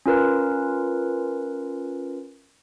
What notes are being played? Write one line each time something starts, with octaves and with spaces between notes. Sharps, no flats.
C#4 F4 A#4 B4